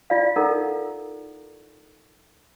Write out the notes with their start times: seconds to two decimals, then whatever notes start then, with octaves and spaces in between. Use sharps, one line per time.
0.10 E4 F4 D5 F5
0.36 D#4 A4 A#4 F#5 A#5